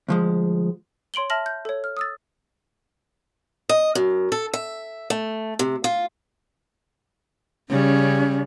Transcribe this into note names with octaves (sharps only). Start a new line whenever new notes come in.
D2 F3 G#3
C#5 C6 D7 F#7 G7
E5 A5 F6 A#6 F#7
G6
A4 C#5
F6
D#6 E6 A6
D#5
F#2
A4
E5
A3
C3
F4
C#3 G3 C#4